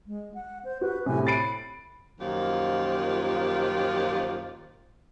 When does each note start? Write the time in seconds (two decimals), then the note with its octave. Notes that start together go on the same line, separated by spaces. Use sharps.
0.07 G#3
0.34 F#5
0.65 C5
0.81 F#4 B4
1.06 A2 C3 G#5
1.27 B5 A6 C7 D7
2.20 F#2 A#2 D#3 F3 F4 G4